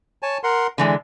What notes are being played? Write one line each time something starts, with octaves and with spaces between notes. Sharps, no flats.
C#5 G#5 A5
A#4 F#5 C6
D3 E3 G#3 D5